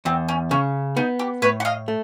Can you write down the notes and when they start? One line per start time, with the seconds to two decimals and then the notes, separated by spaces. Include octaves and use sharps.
0.05 E2 C4
0.29 C#4
0.51 C#3 C#4
0.96 B3 D#4
1.19 G4
1.42 A2 B4 C#5
1.60 F#5
1.65 D#5 F5
1.88 A3